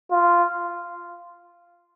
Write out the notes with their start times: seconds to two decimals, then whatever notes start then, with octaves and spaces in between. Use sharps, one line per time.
0.12 F4